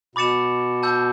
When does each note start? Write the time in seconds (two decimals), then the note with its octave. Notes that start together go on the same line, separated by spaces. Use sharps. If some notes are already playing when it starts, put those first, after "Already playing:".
0.15 B2 B5 D6 A6 C#7 E7
0.83 A5 E6 G6